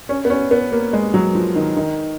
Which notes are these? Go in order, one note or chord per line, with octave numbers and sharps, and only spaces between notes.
C#4
B3
C#4
B3
A#3
G#3
F#3
F3
D#3
D#3